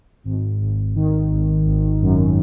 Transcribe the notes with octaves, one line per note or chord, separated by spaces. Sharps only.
G#1
G#1
D#3
G#1
G#1
F#2